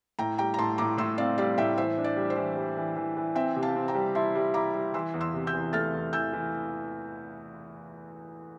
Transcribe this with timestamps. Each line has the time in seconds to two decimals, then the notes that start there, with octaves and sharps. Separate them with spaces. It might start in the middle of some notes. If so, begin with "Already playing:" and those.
0.19 A2 G5 A#5
0.38 G3 G5 A#5
0.54 A#5
0.59 A2 A5 C6
0.78 A2 A#5 D6
0.98 A2 C6 E6
1.18 C4 D5 F5
1.38 G3 D5 F5
1.58 A2 E5 G5
1.78 E3 C5 E5
1.98 D4
2.04 D5
2.16 G3
2.30 C5
2.36 E3
2.56 G3
2.77 E3
2.96 E3
3.17 E3
3.35 C4 E5 G5
3.56 C3
3.63 F5 A5
3.76 C4
3.88 G5 A#5
3.95 G3
4.15 E4 A5 C6
4.35 G3
4.54 E4 A#5 D6
4.74 G3
4.94 E3 C6 E6
5.14 E2
5.21 C6 E6
5.34 C3
5.47 E6 G6
5.53 E2
5.73 A3 F6 A6
5.94 E2
6.13 E3 E6 G6
6.33 E3